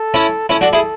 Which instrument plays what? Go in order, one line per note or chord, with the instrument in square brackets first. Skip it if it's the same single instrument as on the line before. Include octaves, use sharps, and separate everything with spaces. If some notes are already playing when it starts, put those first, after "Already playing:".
Already playing: [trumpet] A4
[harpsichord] C#4 E4
[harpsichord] C#4 E4 [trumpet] A4
[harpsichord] D4 F#4
E4 G#4